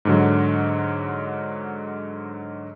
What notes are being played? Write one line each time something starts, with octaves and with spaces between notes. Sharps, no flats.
G#2 D3 F#3